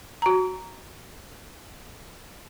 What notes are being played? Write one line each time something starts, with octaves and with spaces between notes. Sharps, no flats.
F#4 A#5